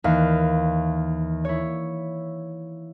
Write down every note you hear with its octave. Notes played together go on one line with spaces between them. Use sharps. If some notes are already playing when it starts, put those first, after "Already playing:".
D#2 E3 F5
E4 C#5